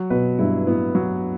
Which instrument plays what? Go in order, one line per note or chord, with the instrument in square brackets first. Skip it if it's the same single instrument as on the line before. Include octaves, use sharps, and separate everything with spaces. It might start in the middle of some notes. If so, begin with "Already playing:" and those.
Already playing: [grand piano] F#3
[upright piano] B2 [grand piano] B4
[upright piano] G2 [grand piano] E4
[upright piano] A2 [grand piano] B3
[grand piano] F#3